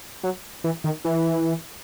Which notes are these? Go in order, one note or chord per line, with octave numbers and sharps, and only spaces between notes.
F#3
E3
D#3
E3